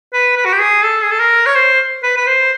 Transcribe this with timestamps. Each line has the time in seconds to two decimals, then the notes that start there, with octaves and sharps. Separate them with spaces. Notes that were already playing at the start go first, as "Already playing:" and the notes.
0.13 B4
0.37 B4
0.46 F#4
0.53 G4
0.60 G#4
0.84 A4
1.03 G#4
1.11 A4
1.19 A#4
1.46 C#5
1.55 C5
2.03 B4
2.17 B4
2.27 C5